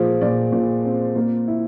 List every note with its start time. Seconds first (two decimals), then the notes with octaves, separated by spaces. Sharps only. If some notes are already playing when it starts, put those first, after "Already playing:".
Already playing: A#2 F3 G#3
0.21 A#2 D5
0.52 A#2
0.85 C4
1.16 A#3
1.48 E4